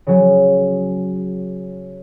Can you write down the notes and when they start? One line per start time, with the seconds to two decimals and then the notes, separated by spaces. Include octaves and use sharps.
0.07 C#3 F#3